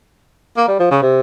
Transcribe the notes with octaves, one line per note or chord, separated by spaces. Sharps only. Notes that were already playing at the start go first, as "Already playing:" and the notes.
A#3
G3
F3
C#3
C3